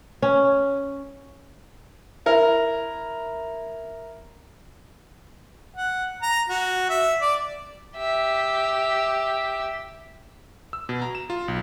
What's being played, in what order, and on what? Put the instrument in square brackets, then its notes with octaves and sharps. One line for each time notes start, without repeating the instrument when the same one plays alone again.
[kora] C#4
[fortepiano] E4 A#4
[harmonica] F#5
A#5
F#4
E5
D5
[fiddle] G4 E5
[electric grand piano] E6
B2
A#5
E7
F4
B1